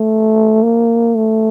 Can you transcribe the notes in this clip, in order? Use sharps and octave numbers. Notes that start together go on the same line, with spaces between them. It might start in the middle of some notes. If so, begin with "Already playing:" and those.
Already playing: A3
A#3
A3